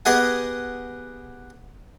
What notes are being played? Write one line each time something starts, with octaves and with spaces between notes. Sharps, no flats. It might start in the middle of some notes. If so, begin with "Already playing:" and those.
B3 G4 G#4 D#5 F#5 G#5